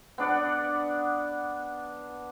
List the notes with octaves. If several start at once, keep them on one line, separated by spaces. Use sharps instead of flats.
B3 D4 D5 F#5